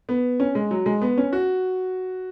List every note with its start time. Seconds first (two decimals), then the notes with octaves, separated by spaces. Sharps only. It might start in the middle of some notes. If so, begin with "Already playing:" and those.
0.09 B3
0.40 C#4
0.55 G#3
0.71 F#3
0.86 G#3
1.02 B3
1.18 C#4
1.33 F#4